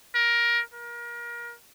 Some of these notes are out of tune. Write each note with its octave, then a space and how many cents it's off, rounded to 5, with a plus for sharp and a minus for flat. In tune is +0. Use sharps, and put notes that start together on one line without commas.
A#4 +20
A#4 +30